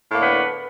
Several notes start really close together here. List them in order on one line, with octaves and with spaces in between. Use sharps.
A2 A#3 D3 B3